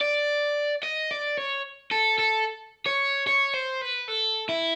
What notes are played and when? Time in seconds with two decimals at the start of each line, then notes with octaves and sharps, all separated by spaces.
0.01 D5
0.83 D#5
1.11 D5
1.37 C#5
1.92 A4
2.19 A4
2.86 C#5
3.27 C#5
3.54 C5
3.81 B4
4.08 A4
4.49 E4